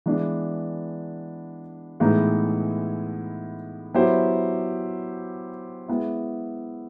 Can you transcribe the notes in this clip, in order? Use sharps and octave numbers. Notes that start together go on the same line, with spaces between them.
E3 G#3 B3 D4
A2 E3 G#3 B3 D#4
F#3 B3 E4 G4 C5
G#3 B3 E4